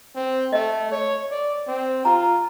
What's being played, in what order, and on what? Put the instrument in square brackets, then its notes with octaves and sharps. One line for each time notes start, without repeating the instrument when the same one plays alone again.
[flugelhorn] C4
[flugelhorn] A3 [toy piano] D#5
[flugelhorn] C#5
D5
C4
[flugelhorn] F4 [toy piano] A#5